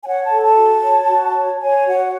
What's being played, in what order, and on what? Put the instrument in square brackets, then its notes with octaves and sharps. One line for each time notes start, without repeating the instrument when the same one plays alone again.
[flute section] G#5
C#5 F#5
A5
A4
A5
F#4
C#5
F#4
C#5
C#5 G#5
F#4 F#5